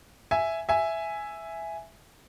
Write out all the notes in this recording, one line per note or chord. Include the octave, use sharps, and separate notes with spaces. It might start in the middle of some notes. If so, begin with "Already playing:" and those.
E5 G#5
E5 G#5